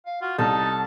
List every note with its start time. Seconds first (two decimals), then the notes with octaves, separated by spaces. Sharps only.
0.06 F5
0.21 F4 F#4
0.38 C2 D#4 A4 A5